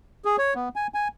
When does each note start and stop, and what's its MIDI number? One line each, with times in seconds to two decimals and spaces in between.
0.25 0.36 68
0.38 0.54 73
0.55 0.69 59
0.76 0.87 80
0.94 1.08 80